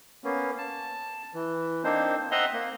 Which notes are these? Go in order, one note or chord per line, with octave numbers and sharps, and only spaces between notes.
A#3 B3 C#4
A5
E3
A#3 C4 D4 D#4 C5
C4 D#5 E5 F#5 A#5 C6
A#3